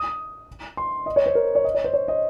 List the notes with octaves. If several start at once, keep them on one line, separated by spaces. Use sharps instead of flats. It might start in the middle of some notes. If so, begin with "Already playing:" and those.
Already playing: D#6
C6
D#5
C#5
C5
A#4
C#5
D#5
C#5
C5
C#5
D#5